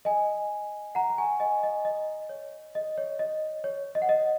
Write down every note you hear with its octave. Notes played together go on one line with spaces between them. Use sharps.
D#5 G#5
F#5 A#5
A#5
G#5 C#6
D#5 G#5
D#5
D#5
C#5
D#5
C#5
D#5
C#5
D#5
F#5
D#5